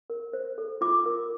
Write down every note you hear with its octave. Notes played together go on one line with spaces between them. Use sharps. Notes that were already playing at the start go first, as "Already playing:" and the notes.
A#4
C5
A4
F4 D6
A#4